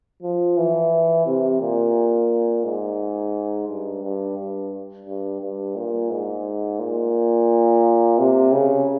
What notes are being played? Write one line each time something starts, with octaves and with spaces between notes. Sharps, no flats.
F3
E3
C3
A#2
G#2
G2
G2
G2
G2
G2
A#2
G#2
A#2
C3
C#3